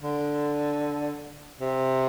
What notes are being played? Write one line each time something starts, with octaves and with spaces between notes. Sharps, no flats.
D3
C3